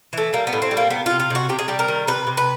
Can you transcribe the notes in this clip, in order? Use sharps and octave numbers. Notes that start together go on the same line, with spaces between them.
E3 A3
G3 A#3
B3
A2
C4
G3
A#3
C3 B3
C3 F4
F4
C3 F#4
C3 G4
G#4
G3 G4
A#4
D#3
C3 B4
C3
B4